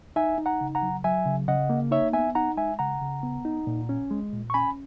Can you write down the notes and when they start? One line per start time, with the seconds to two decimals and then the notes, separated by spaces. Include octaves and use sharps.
0.16 D#4 E5 G#5
0.38 D#4
0.46 F#5 A#5
0.61 C#3
0.75 F#5 A#5
0.82 F#3
1.04 F#3 E5 G#5
1.26 C#3
1.48 C#3 D#5 F#5
1.70 A#3
1.91 D#4 C#5 E5
2.13 B3 E5 G#5
2.35 D#4 F#5 A#5
2.57 G#3 E5 G#5
2.79 C#3 F#5 A#5
3.02 C#3
3.23 B3
3.45 D#4
3.67 A#2
3.89 C#4
4.11 G#3
4.33 A#2
4.50 C#6
4.54 C#4 G#5 B5